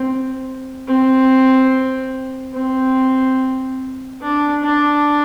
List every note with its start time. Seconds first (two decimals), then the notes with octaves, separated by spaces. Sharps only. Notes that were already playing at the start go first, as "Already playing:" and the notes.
Already playing: C4
0.87 C4
2.54 C4
4.22 D4
4.63 D4